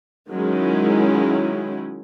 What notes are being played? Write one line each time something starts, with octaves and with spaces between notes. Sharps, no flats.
D#3 F#3 G#3 C#4 E4